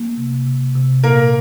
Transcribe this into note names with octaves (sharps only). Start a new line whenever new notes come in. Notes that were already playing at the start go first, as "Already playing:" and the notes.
Already playing: A#3
C3
C3
C3
A#2 A#3 A#4